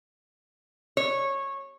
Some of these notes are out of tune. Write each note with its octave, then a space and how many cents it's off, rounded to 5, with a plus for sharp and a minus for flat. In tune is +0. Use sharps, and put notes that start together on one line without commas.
C#5 -15